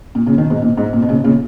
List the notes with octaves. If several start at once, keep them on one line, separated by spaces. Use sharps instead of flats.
A#2
A#2 C#3
B2 D#3
G#2 B2
A#2
G#2
A#2
B2
A#2 C#3
A#2 C#3